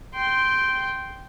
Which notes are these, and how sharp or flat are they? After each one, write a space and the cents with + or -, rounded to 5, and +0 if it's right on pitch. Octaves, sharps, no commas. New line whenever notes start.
G5 -10 C6 +0